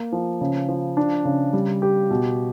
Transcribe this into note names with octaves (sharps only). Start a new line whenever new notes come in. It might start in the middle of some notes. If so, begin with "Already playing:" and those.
Already playing: A#3
F3
C#3
F3
D4
C#3
G3
G4
B2